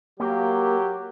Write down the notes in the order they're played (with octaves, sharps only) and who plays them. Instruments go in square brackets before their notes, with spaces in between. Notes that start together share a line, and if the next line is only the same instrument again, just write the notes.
[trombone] F#3 [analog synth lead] A#3 [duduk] G4